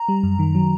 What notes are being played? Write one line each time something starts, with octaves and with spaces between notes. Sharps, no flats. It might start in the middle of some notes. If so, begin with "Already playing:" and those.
Already playing: A#5
G3
F#2
D#3
F#3